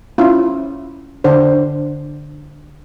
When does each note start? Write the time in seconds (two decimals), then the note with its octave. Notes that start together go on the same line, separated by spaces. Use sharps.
0.18 C#4 E4 F4
1.24 D3 D4 C5